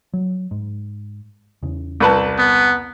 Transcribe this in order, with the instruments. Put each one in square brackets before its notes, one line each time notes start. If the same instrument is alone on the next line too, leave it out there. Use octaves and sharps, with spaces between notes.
[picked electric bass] F#3
G#2
E2 C#3
[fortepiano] C2 B4 A5
[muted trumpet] B3